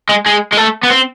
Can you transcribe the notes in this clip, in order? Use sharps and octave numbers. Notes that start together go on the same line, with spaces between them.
G#3
G#3
G#3
A3
B3
C4